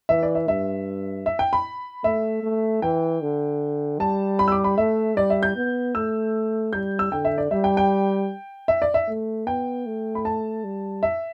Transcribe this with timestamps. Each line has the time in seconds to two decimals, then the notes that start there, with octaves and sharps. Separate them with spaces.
0.09 E3 E5
0.23 D5
0.35 E5
0.48 G2 E5
1.26 E5
1.39 G5
1.53 B5
2.04 A3 E5
2.43 A3
2.82 E3 G5
3.21 D3
3.99 G3 A5
4.39 B5
4.48 E6
4.52 D6
4.64 B5
4.78 A3 E5
5.16 G3 D5
5.30 E5
5.43 G6
5.56 B3
5.95 A3 E6
6.73 G3 G6
6.99 E6
7.12 D3 G5
7.25 E5
7.38 D5
7.51 G3 E5
7.64 G5
7.77 G5
8.68 E5
8.82 D5
8.94 E5
9.08 A3
9.47 B3 G5
9.86 A3
10.15 B5
10.25 A5
10.64 G3
11.03 E5